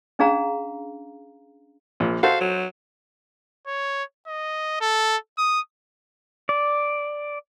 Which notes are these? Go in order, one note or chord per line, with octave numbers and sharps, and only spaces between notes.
C#4 D4 G#4 F5 A#5
A#1 A#2
F#4 A4 C5 F5
F#3
C#5
D#5
A4
D#6
D5